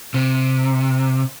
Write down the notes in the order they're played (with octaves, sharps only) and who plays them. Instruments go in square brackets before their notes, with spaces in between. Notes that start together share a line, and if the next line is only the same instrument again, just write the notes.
[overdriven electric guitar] C3